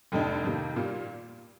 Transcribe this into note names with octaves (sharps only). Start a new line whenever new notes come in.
F1 F2 D3 A3 D#4
F2 C3 D#3 A#3
A#2 G3 A#3 F4